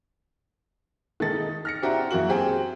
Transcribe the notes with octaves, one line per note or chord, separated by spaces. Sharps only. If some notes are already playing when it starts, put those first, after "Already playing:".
D#3 G#3 A4 A6
D#4
F6 A#6 C#7
C4 D4 E4 F#4 G4 A#5
F#2 A#3 E4 F#4 F#7
C4 G4 G#4